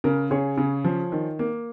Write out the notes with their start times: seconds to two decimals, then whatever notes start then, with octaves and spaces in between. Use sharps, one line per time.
0.04 C#3 A#4
0.31 C#3 G#4 C#5
0.57 C#3
0.84 F3
1.12 D#3
1.39 A#3